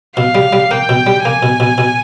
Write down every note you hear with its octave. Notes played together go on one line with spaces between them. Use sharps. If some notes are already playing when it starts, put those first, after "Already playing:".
B2 F5
G3
G3
A#3 G5
B2
G3
A#3 G#5
B2
B2
B2